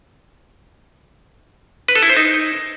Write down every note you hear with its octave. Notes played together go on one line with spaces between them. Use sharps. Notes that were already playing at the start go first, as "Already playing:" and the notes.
B4
A4
E4
C5
D#4